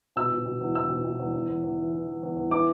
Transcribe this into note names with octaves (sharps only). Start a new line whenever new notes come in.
B2 E6
B2
B2
E2
E2 E6
B2
B2
E2
E2
E2
E2
E3
E3
E3
E2
E2
E3 D6